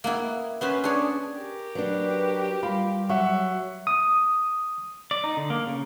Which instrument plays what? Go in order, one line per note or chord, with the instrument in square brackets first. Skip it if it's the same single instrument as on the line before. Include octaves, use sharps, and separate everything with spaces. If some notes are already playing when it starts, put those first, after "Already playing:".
[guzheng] A#3 B3 E4
[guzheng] B3 C#4 C5 [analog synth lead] B4
[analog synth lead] D4 [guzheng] G#4 C#5
[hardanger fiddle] G4 A#4
[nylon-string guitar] F#3 D4 [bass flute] B4
[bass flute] G3 [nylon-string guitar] F4 [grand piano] B5
[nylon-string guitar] F#3 [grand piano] E5 F#5 C#6
[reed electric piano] D#6
[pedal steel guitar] D5
D#4
D3
A#3
C#3